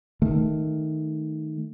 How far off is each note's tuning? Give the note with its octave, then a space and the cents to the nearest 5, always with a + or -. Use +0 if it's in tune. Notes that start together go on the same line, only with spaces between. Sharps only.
D#3 +5 A3 +0